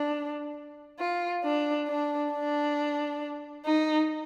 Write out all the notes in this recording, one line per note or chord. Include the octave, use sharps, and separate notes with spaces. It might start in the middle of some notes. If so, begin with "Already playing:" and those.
Already playing: D4
F4
D4
D4
D4
D#4